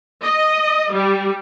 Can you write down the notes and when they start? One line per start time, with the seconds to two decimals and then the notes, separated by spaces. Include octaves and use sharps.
0.23 D#5
0.91 G3